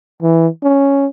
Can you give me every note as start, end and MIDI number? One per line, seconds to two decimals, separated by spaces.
0.22 0.47 52
0.63 1.06 61